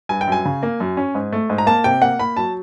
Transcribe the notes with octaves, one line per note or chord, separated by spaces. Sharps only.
G2 G#5
G5
F#2 G#5
C#3
A#3
F#2
C#4
G#2
A3
G#2
A#5
A#3 A5
C3 G5
A#3 F#5
A#3 B5
F#3 A5